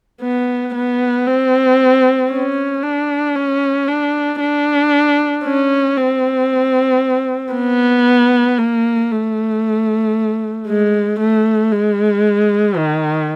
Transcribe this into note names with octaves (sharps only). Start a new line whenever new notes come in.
B3
B3
C4
C#4
D4
C#4
D4
D4
C#4
C4
B3
A#3
A3
G#3
A3
G#3
D#3